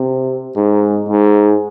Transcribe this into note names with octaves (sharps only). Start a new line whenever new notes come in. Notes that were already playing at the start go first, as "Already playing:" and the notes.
Already playing: C3
G#2
G#2